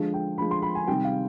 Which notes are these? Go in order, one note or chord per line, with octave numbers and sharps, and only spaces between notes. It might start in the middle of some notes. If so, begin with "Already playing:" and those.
Already playing: D3 F3 G#3
G5
D3 F3 G#3 B5
C6
B5
G#5
C3 D#3 G3 G5
F5